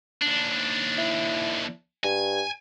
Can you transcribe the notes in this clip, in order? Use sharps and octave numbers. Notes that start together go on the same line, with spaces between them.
D#2 D4
E4
G2 G#5